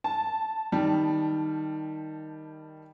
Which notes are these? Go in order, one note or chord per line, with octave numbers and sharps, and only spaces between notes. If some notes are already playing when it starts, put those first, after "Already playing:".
A5
D#3 G3